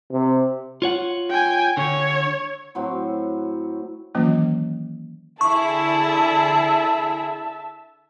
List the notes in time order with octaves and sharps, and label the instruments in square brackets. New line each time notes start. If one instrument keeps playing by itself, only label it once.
[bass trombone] C3
[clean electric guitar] F4 C#5 F#5
[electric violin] G5 G#5
[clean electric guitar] D3 [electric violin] C#5
[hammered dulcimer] A2 F#3 C4 F#4
[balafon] D#3 E3 F#3 A#3 C#4 F4
[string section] D3 E4 G#4 [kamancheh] E5 A5 [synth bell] C#6